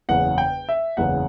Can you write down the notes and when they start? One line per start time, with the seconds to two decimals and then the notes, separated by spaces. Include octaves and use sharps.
0.09 F#1 E2 C#3 F#5
0.38 G5
0.69 E5
0.97 F#1 E2 C#3 F#5